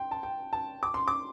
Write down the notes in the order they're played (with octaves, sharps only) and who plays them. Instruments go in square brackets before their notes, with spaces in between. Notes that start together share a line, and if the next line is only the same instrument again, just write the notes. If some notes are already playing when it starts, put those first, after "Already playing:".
Already playing: [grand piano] G5 C6
A5
G5
A5
D6
C6
D6